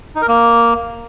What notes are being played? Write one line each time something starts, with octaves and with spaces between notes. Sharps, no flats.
D#4
A#4
A#3